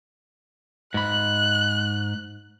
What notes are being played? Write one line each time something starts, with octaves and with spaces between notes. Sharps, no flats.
G#2 B5 F#6